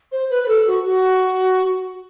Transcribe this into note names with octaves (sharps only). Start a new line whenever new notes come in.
C5
B4
B4
A4
F#4
F#4